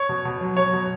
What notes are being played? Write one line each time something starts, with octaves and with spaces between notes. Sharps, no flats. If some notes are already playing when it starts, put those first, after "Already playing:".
Already playing: C#5
B2
B2
F#3
F#3 C#5
B2